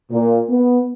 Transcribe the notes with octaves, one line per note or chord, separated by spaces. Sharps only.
A#2
B3